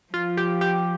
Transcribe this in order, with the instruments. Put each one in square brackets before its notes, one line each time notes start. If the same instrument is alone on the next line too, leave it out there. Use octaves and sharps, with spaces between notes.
[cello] F3 [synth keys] F4
[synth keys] G4
G4